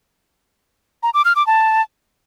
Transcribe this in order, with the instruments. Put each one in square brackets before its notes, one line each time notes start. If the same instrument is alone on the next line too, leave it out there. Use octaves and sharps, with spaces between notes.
[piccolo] A#5
D6
F6
D6
A5